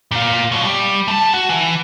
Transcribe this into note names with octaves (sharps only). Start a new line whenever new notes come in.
A#2 F4
B2 F#3
G3
A3 A5
F#4
E3